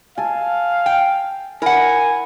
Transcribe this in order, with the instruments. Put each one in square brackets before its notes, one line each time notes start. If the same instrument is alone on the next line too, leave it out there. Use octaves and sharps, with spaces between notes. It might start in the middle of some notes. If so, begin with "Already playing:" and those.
[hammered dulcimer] A4 G#5 [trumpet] F5
[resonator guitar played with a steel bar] G5
[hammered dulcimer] E4 [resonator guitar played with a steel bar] A#4 F#5 [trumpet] G#5